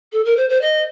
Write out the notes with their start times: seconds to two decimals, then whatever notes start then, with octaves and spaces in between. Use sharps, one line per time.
0.12 A4
0.25 A#4
0.36 C5
0.49 C5
0.61 D#5